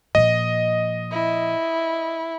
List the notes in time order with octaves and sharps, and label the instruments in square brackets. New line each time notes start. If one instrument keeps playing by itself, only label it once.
[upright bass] A#2 F3 [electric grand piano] D#5
[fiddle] E4